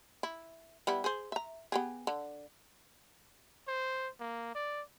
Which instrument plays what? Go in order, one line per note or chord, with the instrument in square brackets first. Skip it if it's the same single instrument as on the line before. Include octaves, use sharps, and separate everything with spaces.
[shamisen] E4
G3 B3 E4
G#4 C5
E5 A#5
B3 G4 G#4
D3
[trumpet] C5
A#3
D5